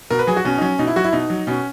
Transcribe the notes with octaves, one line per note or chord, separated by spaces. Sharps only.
B2 A#4
B4
F#3 G#4
F#4
B2 C#4
D#4
F#3 C#4
B2 D#4
E4
F#3 F#4
E4
B2 D#4
F#3
B2 C#4